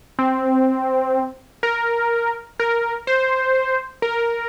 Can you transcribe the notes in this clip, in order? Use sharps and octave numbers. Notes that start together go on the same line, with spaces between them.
C4
A#4
A#4
C5
A#4